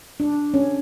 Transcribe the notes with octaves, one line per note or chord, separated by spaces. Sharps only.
D4
C#4